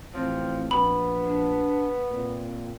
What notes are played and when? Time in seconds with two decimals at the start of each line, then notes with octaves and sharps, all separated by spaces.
0.14 A1 F3 C4
0.71 A#1 B3 B5
1.25 D4
2.10 A#2 C4